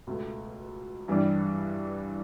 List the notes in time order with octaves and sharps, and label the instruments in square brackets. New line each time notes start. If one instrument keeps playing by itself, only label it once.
[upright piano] C#2 B2 A3
G2 E3 G3 D4